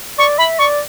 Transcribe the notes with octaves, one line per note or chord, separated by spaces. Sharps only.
D5 C#6
E5 B5
D5 C#6